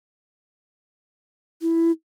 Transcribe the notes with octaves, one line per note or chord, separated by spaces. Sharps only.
E4